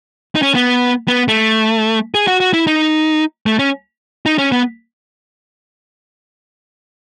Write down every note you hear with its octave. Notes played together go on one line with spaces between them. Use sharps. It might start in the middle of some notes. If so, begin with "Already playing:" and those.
D#4
C#4
B3
B3
A3
G#4
F#4
F#4
E4
D#4
A3
C#4
D#4
C#4
B3